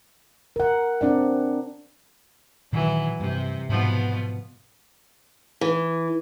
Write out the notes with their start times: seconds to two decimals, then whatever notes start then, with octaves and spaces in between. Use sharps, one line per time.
0.56 A#4 F#5
1.01 C4 D4 D5 F#5
2.73 A#2 D#3 E3 F#3
3.20 G2 C3
3.69 G#2 B2 F3 B3
5.61 E3